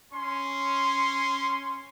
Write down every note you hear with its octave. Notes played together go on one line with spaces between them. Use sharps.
C#4 C6